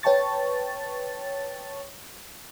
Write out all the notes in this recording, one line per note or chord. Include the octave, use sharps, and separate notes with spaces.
B4 C#5 G5 A5 C#6 A6